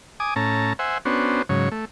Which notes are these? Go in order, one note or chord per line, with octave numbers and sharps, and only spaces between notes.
G#5 D6 D#6
A2 C#4 A5 A#5
C5 E5 F#5 G#5
B3 C#4 D4 F#4 C5
G#2 C#3 F#3 C#5
A3